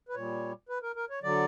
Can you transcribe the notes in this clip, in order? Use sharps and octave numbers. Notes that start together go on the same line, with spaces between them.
B4
A#2 G3 C#5
B4
A#4
A#4
C#5
D3 F#3 D5